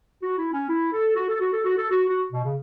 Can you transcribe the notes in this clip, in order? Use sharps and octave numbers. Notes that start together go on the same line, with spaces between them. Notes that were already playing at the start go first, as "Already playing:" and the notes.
F#4
E4
C#4
E4
A4
F#4
A4
F#4
A4
F#4
A4
F#4
F#4
B2
C#3